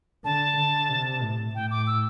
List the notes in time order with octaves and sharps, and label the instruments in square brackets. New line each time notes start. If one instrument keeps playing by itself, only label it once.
[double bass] D3 [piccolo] A5
[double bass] D3
C3
A2
[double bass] A2 [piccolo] G5
[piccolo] D6
E6